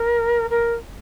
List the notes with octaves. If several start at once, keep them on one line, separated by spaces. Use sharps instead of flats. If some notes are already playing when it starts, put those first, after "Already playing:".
Already playing: A#4
A#4